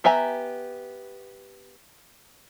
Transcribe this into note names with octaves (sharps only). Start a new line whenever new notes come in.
B3 G4 E5 G#5 A#5